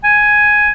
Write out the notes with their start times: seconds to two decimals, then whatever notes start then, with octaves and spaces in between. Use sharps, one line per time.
0.04 G#5